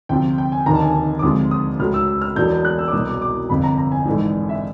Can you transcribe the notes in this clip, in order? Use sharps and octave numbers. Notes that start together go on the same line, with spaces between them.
D2 C3 F3 G5
G5
G#5
F1 D#2 D3 A#5
A5
G#5
A5
D6
D2 C3 F3 G#3 D#6
D#6
C#2 C#3 F#3 A3 F6
E6
E6
F6
E1 E2 B2 F#3 A3 G6
F#6
E6
D6
C2 B2 F#3 D#6
D6
D6
G1 F2 C3 B5
A#5
A#5
G#5
A#1 G#2 E3 A3
E5